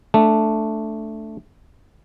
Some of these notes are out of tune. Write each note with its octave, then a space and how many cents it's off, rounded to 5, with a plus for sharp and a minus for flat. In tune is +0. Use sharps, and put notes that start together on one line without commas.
A3 +0 D4 -5